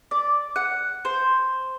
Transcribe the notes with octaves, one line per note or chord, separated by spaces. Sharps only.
D5
F#5
C5